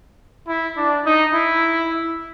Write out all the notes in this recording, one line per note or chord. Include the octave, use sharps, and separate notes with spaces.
E4
D4
D#4
E4